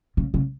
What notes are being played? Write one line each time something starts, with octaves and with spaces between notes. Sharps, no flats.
C#3
C#3